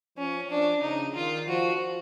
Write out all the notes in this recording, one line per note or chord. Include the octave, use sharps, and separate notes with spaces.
F3 C#4
F3 D4
C#3 D#4
D#3 F4
F3 F#4